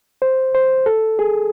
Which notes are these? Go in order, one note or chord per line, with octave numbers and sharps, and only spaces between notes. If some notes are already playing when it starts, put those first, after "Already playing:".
C5
C5
A4
G#4